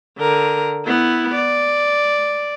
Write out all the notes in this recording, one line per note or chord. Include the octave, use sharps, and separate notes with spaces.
D3 A#4
B3 E4
D5